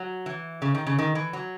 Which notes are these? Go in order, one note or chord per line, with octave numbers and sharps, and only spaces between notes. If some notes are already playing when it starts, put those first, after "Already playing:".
Already playing: F#3
E3
C#3
D#3
C#3
D#3
E3
F#3